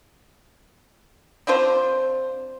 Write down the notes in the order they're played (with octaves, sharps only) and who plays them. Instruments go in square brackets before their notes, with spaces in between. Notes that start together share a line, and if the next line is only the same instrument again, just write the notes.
[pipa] C4 D4 F4 C5